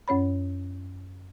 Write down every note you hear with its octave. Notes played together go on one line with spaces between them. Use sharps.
F#2 C#4 C#5 B5